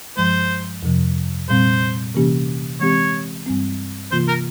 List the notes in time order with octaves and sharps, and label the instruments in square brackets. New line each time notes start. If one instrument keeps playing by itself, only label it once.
[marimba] G2 F3 G#3 [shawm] C5
[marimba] F2 C3 F3
[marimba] A#2 G3 C4 [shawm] C5
[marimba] C3 E3 A#3 C#4 G4
[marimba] E3 G#3 C4 G4 [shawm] C#5
[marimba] G2 G3 C4
[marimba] C3 E3 A#3 F4 [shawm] C5
[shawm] A#4